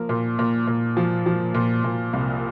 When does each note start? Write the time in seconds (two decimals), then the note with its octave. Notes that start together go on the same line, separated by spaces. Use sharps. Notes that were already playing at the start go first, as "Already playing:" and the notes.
Already playing: F3 A#3
0.09 A#2
0.39 A#2
0.67 A#2
0.97 F3
1.26 F3
1.54 A#2
1.84 A#2
2.13 C2